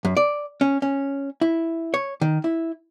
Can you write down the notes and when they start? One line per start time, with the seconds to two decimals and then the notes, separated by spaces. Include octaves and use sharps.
0.05 F#2
0.17 D5
0.61 C#4
0.82 C#4
1.41 E4
1.94 C#5
2.21 D#3
2.44 E4